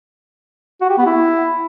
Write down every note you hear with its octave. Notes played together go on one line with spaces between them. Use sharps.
F#4
G4
B3
E4